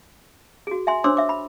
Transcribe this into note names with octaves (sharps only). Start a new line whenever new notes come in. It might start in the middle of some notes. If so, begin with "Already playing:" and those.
F#4 G#4
E5 G#5 C6
D4 C5 C#5 C6 D6 E6
E5 D6
B5